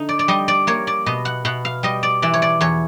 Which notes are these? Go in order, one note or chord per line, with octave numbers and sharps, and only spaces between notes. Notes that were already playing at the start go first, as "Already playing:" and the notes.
Already playing: D3 D#4
D5
D5
G3 D#5
D5
A#3 C#5
D5
B2 D#5
F#5
B2 F#5
F5
G3 D#5
D5
E3 D5
C#5
D5
E2 C#5